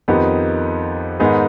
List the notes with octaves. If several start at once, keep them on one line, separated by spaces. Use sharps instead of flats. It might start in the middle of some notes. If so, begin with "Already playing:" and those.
F2 D#3 B3 D#4 G4
G#2 D#3 B3 D#4 G#4